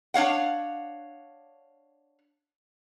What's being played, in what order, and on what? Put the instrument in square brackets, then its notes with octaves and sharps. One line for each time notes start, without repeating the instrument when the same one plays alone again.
[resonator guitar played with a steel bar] D4 C#5 F5 F#5